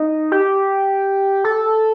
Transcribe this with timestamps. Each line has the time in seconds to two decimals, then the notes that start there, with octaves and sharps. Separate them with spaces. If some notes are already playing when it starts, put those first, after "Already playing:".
Already playing: D#4
0.32 G4
1.44 A4